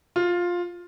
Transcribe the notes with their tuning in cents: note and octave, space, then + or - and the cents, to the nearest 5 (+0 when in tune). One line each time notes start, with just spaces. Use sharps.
F4 +10